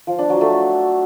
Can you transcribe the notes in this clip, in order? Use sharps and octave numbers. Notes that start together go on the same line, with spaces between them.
F3
D4
F#3
A3